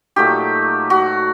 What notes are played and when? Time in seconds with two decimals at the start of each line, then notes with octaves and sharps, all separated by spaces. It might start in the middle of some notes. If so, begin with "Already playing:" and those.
0.16 A#2 F#3 A3 D#4 G4
0.90 F#4